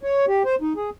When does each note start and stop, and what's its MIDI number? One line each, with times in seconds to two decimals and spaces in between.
0.03 0.26 73
0.28 0.43 67
0.45 0.55 72
0.61 0.73 63
0.76 0.90 68